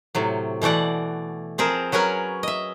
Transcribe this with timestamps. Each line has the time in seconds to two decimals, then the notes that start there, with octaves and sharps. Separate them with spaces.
0.15 A2 C3 F#3
0.62 B2 E3 A3 D5 F#5
1.58 F3 C4 G#4 A#4
1.92 F#3 C#4 A#4 B4 G#5
2.43 D#5 E5